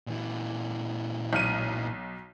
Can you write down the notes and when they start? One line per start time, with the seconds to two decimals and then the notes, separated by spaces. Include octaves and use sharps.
0.07 A#2 E3
1.33 B1 F6 D#7